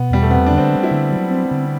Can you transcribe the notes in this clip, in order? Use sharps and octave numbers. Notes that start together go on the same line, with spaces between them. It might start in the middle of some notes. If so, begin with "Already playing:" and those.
Already playing: B2 B3
E2 G3
A3
B3 C4
D3 D4
C4
G3
E4
D3
F#3
C4
D3